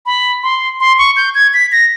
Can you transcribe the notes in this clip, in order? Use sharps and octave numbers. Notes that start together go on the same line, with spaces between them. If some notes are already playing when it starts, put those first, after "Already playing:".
B5
C6
C6
C#6
G6
G#6
B6
A#6